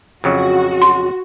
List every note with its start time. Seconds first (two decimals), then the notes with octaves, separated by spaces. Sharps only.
0.24 F2 C#3 F#3 F#4
0.82 C6